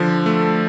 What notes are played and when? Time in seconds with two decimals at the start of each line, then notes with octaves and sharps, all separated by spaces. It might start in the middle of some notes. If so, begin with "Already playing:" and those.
Already playing: D3 F3
0.26 A3